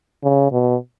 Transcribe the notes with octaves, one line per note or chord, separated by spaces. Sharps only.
C#3
B2